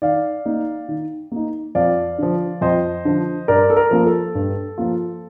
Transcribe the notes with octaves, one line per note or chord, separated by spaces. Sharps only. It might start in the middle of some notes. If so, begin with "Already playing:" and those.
D#3 D5 F5
A#3 D#4
D#3
A#3 D#4
F2 D5 F5
D3 F3
F2 C5 D#5
D3 F3
G2 A#4 D5
A4
A#4
F3 A#3 F4
A4
G2
F3 A#3 F4